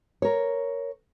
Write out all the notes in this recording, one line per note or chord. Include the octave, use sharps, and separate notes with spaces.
A#4 C#5